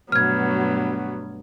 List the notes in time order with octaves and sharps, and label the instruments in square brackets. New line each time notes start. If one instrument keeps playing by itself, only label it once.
[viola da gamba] G2 B2 A3 [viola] F#3 B3 [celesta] F6 G#6